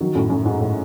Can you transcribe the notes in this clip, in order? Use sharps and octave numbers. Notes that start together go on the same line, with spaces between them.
D#3 F#3
F#2 A2
F#2 A2
G#2
A2